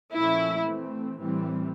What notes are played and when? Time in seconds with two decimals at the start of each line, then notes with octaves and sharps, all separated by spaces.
0.12 A#2 F3 A3 C#4 E4
0.64 E3 A3 C4
1.16 A2 E3 G3 C4